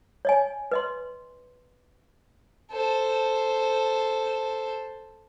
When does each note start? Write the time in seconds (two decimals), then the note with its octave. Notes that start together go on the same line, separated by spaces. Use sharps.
0.25 C#5 D#5 G#5
0.72 B4 D#5 C6
2.71 A4 C5